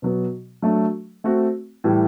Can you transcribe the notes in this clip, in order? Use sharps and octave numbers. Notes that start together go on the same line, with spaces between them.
B2 F#3 B3
F#3 A3 D4 A4
A3 C4 F#4
A2 E3 G3